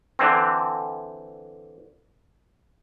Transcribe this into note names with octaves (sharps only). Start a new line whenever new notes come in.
D3 E3 C4